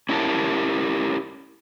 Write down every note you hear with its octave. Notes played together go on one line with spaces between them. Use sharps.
C#4 E4 G4 A#4 A5